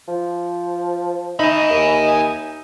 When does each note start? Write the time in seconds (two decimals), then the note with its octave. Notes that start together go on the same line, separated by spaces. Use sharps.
0.08 F3
1.39 D#4 D#5 E5 G#5 B5
1.70 D#2